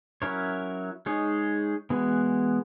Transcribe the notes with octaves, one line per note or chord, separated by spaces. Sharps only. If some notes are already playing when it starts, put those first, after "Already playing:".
F#3 C#4 E4 A#4 C#5
G#3 D#4 G#4 C#5
E3 G#3 B3 F#4